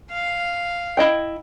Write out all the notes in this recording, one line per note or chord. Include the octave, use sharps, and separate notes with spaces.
F5
E4 D#5 G5